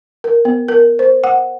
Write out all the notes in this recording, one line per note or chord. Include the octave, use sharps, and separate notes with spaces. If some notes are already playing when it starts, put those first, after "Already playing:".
A#4
B3
A#4
C5
F#5